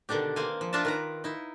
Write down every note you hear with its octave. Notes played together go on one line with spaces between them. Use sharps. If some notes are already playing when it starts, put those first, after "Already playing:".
B2 D3 D#3 D4 G4
A#3 C4 C5 F5 G#5
F3
D4 F4 A#4 E5 A5
D#3 B4 A#5
D#4 E4